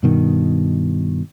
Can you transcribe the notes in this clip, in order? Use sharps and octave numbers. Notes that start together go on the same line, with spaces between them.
G2 B2 D#3